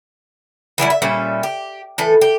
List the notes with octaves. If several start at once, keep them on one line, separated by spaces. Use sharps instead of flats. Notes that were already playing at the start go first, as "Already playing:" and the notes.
E3 F#3 G3 E4
E5
A#2 G3 C#4 E5
G4
A2 E3 A4
G4